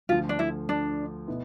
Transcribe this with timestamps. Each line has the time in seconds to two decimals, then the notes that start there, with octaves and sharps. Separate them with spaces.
0.09 D2 D3 F3 F4
0.29 D4
0.39 E4
0.69 D4
1.28 B2 B3 E4